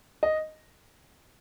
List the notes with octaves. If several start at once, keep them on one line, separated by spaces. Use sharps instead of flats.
D#5